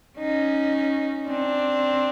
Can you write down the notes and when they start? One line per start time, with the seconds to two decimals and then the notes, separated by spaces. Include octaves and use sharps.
0.19 C#4 D#4
1.28 C4 D4